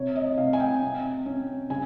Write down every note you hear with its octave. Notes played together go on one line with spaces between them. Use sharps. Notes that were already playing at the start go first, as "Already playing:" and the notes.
Already playing: C3 C#5
D#5
D#5
C3 F5
G#5
G5
C3
C#4
C#3 G#5